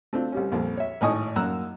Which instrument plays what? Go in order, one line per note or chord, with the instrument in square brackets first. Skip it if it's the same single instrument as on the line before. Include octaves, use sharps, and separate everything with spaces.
[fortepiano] A3 C4 D4 F4
C2 G3 C#4
C2 F2 A#2
C#5 E5
G#1 A2 D#5 G#5 C#6 D#6
F#2 A#3 A#5 E6 F#6